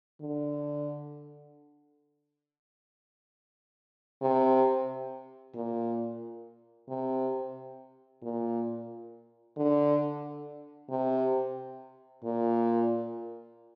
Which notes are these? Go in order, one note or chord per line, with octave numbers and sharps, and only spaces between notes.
D3
C3
A#2
C3
A#2
D3
C3
A#2